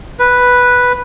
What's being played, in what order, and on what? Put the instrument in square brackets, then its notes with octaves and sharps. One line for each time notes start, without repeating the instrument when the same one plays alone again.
[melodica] B4